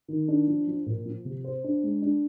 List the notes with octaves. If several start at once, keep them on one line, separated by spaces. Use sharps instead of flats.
D#3
D4
F3
F3
A#2
F3
C3
C5
D4
G#3
D4